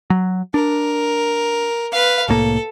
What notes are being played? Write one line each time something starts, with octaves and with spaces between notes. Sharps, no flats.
F#3
D4 A#4
B4 F5
C2 A2 A#3 A4